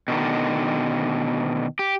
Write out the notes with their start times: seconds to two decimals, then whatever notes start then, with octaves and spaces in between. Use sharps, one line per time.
0.08 B2 D3 D#3
1.79 G4